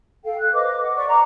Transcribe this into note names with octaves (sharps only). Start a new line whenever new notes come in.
A4 F5 G5
F#6
B4 C5 D#5 D6
F#5
D5 E5 C#6
A#5 C#6 D6